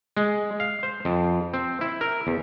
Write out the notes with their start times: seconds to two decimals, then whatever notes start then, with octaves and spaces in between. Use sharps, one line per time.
0.17 G#3
0.60 F5
0.83 C5
1.05 F2
1.54 C4
1.81 E4
2.01 A#4
2.27 E2